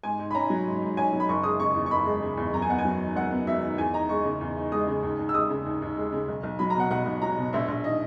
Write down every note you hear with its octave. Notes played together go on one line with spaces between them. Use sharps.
G#2 G#5
G#2
B5
C#4 A#5
F#3
G#2
G#2
C#4 G#5
F#3
B5
F#1 C#6
G#3 D#6
C#3 C#6
E2
C#6
F#1 B5
G#3
C#3
E2
F#2 A#5
G#5
B3 F#5
G#5
F#3
D#3
F#2 F#5
B3
F#3 E5
D#3
E2 G#5
D#4 A#5
G#3 C#6
C#3
E2
D#4
G#3 D#6
C#3
D#2
D#2
E6
G#3 D#6
C#3
D#2
D#2
G#3
C#3
B1
B1
F#3 B5
A#5
B2 F#5
B1 F#5
B1
F#3 A#5
B2
A#1 E5
A#1
D#3 D#5